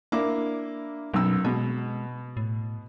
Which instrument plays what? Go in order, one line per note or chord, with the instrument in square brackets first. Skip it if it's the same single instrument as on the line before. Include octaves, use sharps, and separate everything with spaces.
[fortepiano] A#3 E4 D6 [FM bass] D4
[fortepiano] B1 F#2 E6 [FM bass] B2
[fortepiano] B2 [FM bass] G#3
[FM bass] A2